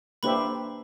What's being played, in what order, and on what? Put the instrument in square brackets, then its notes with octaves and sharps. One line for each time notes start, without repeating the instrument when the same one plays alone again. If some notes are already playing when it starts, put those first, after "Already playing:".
[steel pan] A#3 D4 G4 C5 E5 [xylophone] B4 B5